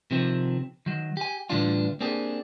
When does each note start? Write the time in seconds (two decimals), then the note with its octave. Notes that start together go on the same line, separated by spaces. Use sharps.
0.11 C3 D#3 F3 C4
0.86 D#3 F#3
1.17 G4 G#5
1.50 A2 D3 E3 G3 D4 F4
2.01 A#3 C4 D4 G4 G#4